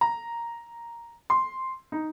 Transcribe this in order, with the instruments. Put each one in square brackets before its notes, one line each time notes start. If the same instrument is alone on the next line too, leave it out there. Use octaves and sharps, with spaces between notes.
[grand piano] A#5
C6
D#4